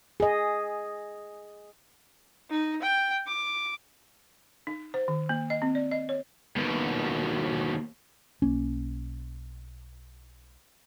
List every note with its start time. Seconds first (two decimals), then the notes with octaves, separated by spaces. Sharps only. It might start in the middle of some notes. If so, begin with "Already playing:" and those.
0.20 G#4 D#5
2.50 D#4
2.82 G5
3.27 D6
4.67 D#4
4.94 C5
5.08 D#3
5.29 A#3
5.50 D#5
5.62 C4
5.75 D5
5.91 D#5
6.09 C#5
6.57 D#2 B2
8.42 B1 A#3 C#4